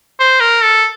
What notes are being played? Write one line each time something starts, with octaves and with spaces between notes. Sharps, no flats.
C5
A#4
A4